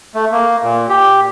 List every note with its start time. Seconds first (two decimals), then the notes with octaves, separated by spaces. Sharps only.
0.15 A3
0.32 A#3
0.63 A#2
0.89 G4